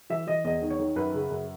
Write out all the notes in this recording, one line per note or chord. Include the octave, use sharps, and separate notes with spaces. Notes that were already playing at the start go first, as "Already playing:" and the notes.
E3 E5
E3 D#5
E2 D#5
D#3
C#5
D#3
F#2 B4
C#3
F#2